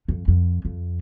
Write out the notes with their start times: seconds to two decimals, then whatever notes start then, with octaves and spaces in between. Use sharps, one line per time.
0.08 F2
0.28 F2
0.65 F2